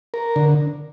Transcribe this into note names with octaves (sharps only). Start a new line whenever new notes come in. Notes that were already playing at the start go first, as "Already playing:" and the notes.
A#4
D3